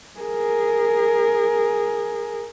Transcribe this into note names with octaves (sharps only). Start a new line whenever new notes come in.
G#4 A#4